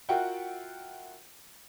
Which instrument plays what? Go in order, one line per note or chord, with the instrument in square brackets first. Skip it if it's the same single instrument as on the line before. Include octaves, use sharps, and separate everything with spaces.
[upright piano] F4 F#4 A#4 E5 F#5 G5